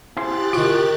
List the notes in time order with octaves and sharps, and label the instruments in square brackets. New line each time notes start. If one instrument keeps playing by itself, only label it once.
[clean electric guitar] E4 G#4 C5 [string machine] G4 F#6 A6
[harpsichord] D#3 F#4 [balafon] F4